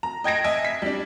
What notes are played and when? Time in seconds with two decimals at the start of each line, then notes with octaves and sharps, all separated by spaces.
0.03 A#5
0.24 D#5 G5 G#6 A#6 D7
0.44 D#5 E5 G#5
0.65 B6
0.82 G3 D4